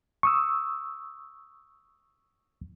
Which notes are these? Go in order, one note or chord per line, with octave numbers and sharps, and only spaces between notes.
C#6 D#6 E6